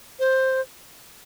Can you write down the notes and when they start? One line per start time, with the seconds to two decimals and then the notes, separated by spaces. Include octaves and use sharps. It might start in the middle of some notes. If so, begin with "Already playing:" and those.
0.19 C5